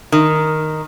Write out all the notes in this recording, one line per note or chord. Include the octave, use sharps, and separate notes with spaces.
D#3